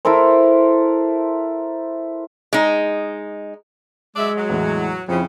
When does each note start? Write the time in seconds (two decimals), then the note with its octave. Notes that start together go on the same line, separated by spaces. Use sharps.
0.05 E4 A4 A#4 C5
2.53 G#3 D#4
4.16 F#3 G#3 D5 E5
4.37 F#3
4.49 E2 A2 E3
5.08 F2 C#3 F3 E4